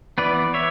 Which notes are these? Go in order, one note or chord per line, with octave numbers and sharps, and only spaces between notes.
E3 B3 B4 D5
C#5 E5